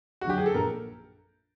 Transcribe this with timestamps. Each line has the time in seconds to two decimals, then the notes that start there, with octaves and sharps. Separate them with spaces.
0.21 F#4
0.25 F#2 D3 F#3 G4
0.38 G#4
0.46 A4
0.54 A#1 A#4